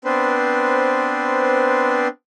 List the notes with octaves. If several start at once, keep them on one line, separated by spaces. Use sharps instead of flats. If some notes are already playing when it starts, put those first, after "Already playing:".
B3 C4 D4 B4 C5